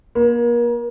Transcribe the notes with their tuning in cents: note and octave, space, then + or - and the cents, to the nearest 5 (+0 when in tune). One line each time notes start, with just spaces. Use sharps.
A#3 +35